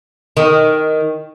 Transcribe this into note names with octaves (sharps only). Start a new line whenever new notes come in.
D#3